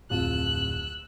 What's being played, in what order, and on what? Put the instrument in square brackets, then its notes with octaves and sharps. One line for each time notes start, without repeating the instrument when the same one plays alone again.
[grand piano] D1 F2 F4 [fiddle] E6 F#6